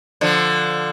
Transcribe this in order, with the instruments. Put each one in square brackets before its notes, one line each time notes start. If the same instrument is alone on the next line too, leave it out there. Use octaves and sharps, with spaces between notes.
[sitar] D3 F3